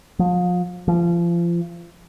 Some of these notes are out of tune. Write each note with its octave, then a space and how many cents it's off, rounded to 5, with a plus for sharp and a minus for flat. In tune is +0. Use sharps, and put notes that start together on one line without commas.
F3 +35
F3 -30